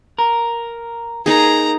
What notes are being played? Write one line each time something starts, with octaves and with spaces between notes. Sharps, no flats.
A#4
A#3 D#4 G#4 A#5